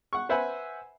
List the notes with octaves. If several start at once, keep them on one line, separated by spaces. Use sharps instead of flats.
F#5 C#6
B4 C5 E5 F#5 G#5 B5